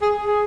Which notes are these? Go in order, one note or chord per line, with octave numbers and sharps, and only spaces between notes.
G#4
G#4